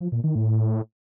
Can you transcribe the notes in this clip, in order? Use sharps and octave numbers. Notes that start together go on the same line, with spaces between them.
F3
A#2
D#3
A2